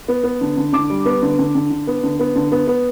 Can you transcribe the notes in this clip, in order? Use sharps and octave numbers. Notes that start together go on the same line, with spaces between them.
B3
B3
D3
D3
D3 D6
G3
B3
D3
D3
D3
D3
B3
D3
B3
D3
B3
B3